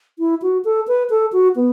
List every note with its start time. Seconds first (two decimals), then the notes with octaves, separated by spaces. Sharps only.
0.19 E4
0.42 F#4
0.65 A4
0.88 B4
1.10 A4
1.33 F#4
1.56 B3